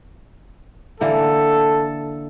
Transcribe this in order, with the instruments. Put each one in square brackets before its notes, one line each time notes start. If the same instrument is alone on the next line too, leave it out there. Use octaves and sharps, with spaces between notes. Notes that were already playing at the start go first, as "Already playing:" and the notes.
[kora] D3 E3 A#3 [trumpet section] A4